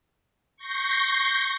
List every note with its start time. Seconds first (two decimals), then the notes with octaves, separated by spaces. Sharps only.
0.57 C#6 G6 A#6 C7